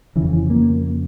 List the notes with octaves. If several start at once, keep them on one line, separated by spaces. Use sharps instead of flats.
C#3 E3
F2
E3
A#3